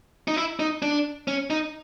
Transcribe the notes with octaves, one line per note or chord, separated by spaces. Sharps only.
D#4
E4
D#4
D4
C#4
D#4